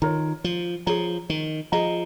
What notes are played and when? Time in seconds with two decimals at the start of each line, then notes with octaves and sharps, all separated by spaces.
0.02 D#3 F4 A#4 C#5 A#5
0.44 F3
0.86 F3 G#4 C#5 A#5
1.30 D#3
1.72 F3 G#4 D#5 A#5